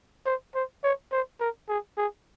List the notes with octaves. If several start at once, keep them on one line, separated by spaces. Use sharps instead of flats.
C5
C5
C#5
C5
A#4
G#4
G#4